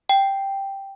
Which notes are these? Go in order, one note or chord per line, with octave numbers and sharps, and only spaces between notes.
G5